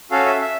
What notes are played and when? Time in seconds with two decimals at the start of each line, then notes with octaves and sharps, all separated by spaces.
0.11 C#4 F#4 A4 F5
0.26 E5
0.41 E5